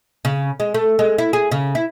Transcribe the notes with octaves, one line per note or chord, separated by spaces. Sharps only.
C#3
G#3
A3
G#3
E4
G#4
C#3
E4